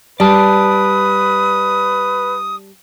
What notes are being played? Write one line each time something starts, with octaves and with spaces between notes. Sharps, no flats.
G3 B4 D5 A5 D#6